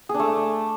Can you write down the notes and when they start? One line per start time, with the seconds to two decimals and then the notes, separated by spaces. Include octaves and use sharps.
0.09 G#4
0.14 D4
0.19 A3